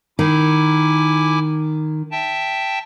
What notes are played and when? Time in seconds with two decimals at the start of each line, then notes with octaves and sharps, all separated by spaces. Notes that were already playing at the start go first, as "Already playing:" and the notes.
0.19 D#3 E4 G#5 D6
2.11 E5 G5 A5